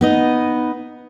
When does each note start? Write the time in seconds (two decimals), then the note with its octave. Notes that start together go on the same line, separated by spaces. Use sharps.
0.01 B3 D#4 D#5